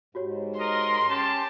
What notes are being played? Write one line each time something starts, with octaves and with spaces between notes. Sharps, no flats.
G#2 F#4 G4 C#5
A#4 D#5 C6
C#4 G4 A5